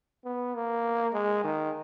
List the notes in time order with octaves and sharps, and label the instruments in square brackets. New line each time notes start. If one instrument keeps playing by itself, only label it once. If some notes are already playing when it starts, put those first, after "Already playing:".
[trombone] B3
A#3
G#3
D#3